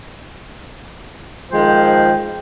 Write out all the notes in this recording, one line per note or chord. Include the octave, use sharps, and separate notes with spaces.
D#3 F3 G#3 C5 G5